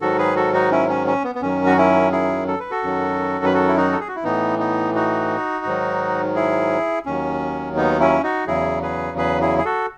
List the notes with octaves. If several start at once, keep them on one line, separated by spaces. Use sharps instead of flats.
G#2 D#3 F#3 F#4 A4
G#4 B4
F#4 A4
D#4 F#4
C#4 E4
C#4
C#4
B3
B3
F#2 D#3 F#3 C#4
F#4
C#4 E4
E4 G#4
A4
B4
F#4 A4
F#2 D#3 F#3
B4
F#4 A4
E4
D#4 F#4
A4
G#4
F#4
E4
A2 E3 B3 D#4
B3 D#4
D#4 F#4
G#2 D#3 F#3
E4 G#4
D#2 D#3 F#3 C#4
B3 D#4
C#4 E4
D#4 F#4
E2 C#3 F#3 E4 G#4
G#4 B4
G#4 B4
E4 G#4
G#4
F#4 A4